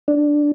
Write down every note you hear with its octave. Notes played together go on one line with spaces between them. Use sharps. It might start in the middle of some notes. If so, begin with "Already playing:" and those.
D4